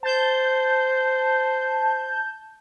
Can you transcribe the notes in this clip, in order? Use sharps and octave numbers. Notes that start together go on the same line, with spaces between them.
C5 A5 G6